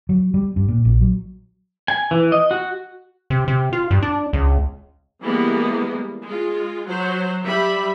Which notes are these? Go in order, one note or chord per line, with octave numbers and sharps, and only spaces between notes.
F#3
G3
G2
A#2
A#1
F#3
G#5
E3
D#5
F#4
C3
C3
F4
G2
D4
C#2
E3 G3 G#3 A#3 B3
G#3 F4
F#3 C5
G3 E5 B5